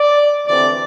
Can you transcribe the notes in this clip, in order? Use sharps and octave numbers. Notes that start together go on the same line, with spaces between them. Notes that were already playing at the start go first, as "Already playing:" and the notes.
Already playing: D5
D2 C3 E3 A3 C4 D5